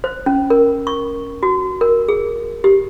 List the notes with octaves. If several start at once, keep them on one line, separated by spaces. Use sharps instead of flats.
C5
C#4
A#4
C#6
F#4
A#4
G#4
G4